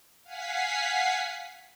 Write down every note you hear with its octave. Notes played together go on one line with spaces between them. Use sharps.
F5 F#5 G#5 B6 C7